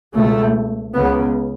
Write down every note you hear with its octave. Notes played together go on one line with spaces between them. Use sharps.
C#2 B2 A3
C#2 C#3 B3